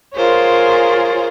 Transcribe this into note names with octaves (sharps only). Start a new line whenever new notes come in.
F4 G#4 A#4 C5 C#5